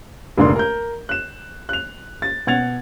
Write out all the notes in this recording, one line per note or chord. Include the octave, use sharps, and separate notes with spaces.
F1 G#2 D3 A#3 D5 C6
A#4 G6
F#6 E7
F#6 F7
A6
B2 F#5 G#6 A6 F7